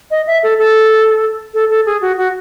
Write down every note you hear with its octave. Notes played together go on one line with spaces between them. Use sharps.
D#5
E5
A4
A4
A4
A4
G#4
F#4
F#4